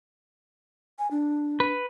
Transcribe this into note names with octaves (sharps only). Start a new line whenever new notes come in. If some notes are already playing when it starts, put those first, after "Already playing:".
G#5
D4
B4